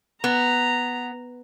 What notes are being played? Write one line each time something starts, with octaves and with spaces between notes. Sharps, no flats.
B3 A#5